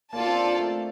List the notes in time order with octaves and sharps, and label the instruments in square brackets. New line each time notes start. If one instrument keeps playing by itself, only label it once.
[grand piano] A#3 [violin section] F4 A4 D5 A5
[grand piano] C4
D4
A3